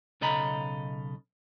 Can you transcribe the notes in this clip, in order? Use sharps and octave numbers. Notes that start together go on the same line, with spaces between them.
B1 C#3 A4 D#5 A#5 B5